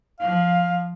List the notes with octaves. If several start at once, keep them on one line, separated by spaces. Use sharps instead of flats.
F3 F5